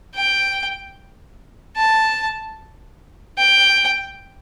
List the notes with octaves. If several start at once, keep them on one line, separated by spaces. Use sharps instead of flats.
G5
A5
G5